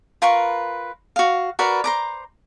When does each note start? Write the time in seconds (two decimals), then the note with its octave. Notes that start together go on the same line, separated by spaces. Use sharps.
0.22 F4 A#4 B4 C#6
1.16 F#4 F5
1.59 F#4 A#4 B4 D5
1.84 C5 A#5 D6